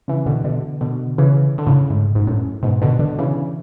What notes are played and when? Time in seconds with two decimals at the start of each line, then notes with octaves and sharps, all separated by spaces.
0.08 C#3 E3
0.26 B2 D3
0.44 B2 D3
0.81 B2 D3
1.18 C#3 E3
1.58 D3
1.66 A2 C#3
1.90 G#2
2.15 G#2
2.27 F#2 A2
2.63 G#2 B2
2.82 B2 D3
2.99 B2 D3
3.18 C#3 E3